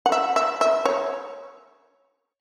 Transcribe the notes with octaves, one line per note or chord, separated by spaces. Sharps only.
F#5
E5
E5
E5
C#5